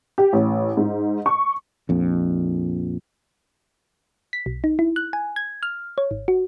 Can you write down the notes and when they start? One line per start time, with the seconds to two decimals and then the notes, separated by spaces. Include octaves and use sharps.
0.18 G4
0.33 A1
0.77 G#2
1.26 C#6
1.89 A#1 F2
4.33 B6
4.46 B1
4.64 D#4
4.79 E4
4.96 F#6
5.13 G#5
5.36 G#6
5.63 F6
5.98 C#5
6.11 G#1
6.28 F#4